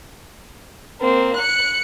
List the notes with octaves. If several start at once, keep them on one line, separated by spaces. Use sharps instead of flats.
A#3 C4
F#6 C#7